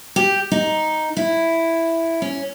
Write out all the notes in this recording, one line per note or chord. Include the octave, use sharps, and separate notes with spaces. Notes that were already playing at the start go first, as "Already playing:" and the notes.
G4
D#4
E4
C#4